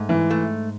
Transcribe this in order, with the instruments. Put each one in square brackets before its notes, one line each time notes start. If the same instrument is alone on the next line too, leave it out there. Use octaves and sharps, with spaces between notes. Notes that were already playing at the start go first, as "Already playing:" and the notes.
Already playing: [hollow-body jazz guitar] G#2 A3
[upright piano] E3
[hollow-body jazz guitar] A3